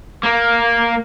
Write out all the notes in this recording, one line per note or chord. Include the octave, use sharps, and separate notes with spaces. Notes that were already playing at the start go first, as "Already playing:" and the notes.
A#3